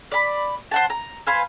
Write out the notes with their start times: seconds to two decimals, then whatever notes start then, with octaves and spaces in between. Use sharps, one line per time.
0.12 D5 B5
0.71 C5 F#5 A5
0.90 A#5
1.27 B4 C5 F5 G#5